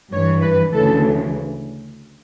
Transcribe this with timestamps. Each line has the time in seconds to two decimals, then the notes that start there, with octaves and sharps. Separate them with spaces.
0.11 G2 E3 C#5
0.42 B4
0.72 D2 C#3 E3 A4